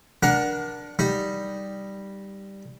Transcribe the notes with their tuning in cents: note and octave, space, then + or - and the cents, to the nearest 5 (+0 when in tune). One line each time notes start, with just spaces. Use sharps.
D4 +0 A#4 +30 F#5 +0
G3 +0 D#4 +5